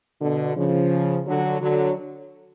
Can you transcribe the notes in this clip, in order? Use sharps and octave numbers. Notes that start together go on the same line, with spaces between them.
B2 D3
C#3 F3
D3 F#3
D3 F#3